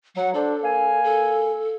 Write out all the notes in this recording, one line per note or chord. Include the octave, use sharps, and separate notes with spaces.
F#3 F#5
D4 A4 C5
A#3 F5 G#5
A4